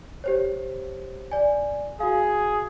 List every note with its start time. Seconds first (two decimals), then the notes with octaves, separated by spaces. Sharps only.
0.24 G4 C5 C#5
1.31 D5 G#5
2.00 F#4 G#4 F5